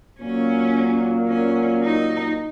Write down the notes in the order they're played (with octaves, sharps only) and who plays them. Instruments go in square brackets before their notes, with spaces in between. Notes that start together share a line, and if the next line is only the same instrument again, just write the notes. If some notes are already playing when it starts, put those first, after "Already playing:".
[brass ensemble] A#2 F#3 A#3 [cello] C#4
[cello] C#4
D#4